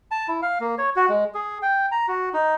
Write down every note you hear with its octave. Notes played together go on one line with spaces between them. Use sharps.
A5
E4
F5
A#3
C#5
F#4
G#3
G#4
G5
A#5
F#4
D#4